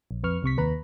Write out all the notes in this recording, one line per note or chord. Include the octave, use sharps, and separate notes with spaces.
A#1
F2 B4 C#6 F6
C2 C3 C#6 B6
D#2 B4 A#5 B5